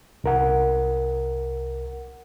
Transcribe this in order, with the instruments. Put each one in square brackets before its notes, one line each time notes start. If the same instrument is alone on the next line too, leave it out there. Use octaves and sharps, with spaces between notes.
[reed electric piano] C2 A#4 F#5